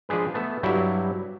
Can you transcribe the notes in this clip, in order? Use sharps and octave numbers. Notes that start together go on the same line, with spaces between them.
F3 G#3 D4 G#4 B4
A3 B3 A5
G2 F#3 G3 E4